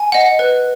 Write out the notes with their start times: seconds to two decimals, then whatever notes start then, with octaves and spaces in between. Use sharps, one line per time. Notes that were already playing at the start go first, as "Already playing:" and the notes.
Already playing: G#5
0.12 D#5 F#5
0.39 B4